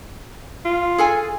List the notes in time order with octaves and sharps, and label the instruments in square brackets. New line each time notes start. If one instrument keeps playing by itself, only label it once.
[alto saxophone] F4
[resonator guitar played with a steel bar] G#4 A4 G#5